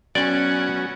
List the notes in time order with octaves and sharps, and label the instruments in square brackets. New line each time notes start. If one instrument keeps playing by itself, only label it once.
[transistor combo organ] F#3 B3 F#4 [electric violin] C#4 [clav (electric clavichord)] D5